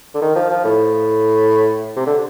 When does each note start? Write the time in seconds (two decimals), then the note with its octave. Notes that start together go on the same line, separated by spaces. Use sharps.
0.14 D3
0.21 D#3
0.35 F3
0.50 F3
0.65 A2
1.96 C3
2.07 D3